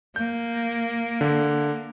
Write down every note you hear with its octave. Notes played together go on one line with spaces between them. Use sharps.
A#3 G6
D3